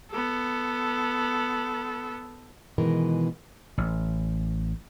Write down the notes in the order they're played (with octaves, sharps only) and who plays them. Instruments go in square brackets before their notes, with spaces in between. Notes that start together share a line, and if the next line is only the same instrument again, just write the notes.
[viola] B3 A4
[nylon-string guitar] B2 D#3 E3 G#3 A#4
[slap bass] A1